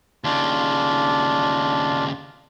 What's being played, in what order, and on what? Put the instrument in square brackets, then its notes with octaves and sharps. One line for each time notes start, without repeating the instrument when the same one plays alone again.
[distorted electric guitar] D#2 C#3 [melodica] D4 F4